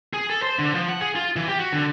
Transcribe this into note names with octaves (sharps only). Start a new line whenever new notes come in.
G#4
A4
C5
D3
F3
F#5
G#4
F4
E3
G4
F#4
D3